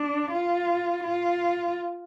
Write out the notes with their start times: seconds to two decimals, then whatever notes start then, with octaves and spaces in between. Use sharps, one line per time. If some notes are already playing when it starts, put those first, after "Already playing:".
Already playing: D4
0.31 F4
1.04 F4